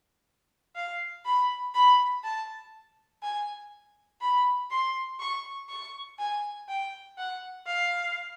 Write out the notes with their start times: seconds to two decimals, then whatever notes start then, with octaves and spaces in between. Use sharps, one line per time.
0.75 F5
1.25 B5
1.74 B5
2.24 A5
3.22 G#5
4.21 B5
4.71 C6
5.20 C#6
5.69 C#6
6.19 G#5
6.68 G5
7.17 F#5
7.67 F5